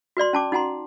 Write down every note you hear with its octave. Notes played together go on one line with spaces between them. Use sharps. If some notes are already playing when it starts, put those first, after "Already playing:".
F#4 B4 D5 C6
C#4 A5 D6
D#4 F#4 F#5 G#5 A#5 C6